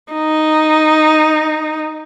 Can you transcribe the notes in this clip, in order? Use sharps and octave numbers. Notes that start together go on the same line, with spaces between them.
D#4